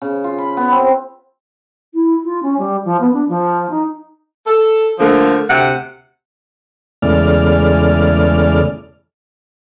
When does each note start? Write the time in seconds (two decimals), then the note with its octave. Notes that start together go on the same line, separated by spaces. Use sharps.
0.02 C#3
0.24 F4
0.38 B5
0.57 B3
0.72 C4
1.94 E4
2.24 F4
2.42 C#4
2.58 G3
2.84 F3
3.00 B3
3.13 D4
3.28 F3
3.70 D#4
4.47 A4
4.99 D3 F3 A3 A#3
5.50 D2 C3 F#5
7.02 E2 C#3 G#3 A3 D5 F6